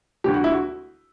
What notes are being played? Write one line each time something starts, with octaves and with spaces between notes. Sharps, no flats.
D2 D3 G3 G4
F#4
E4
F#4